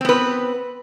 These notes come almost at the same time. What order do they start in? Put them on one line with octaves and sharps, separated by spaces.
C4 B3 B4